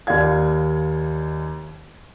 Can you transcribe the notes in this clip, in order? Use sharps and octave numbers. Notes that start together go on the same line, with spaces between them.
D#2 D5 F5 G#6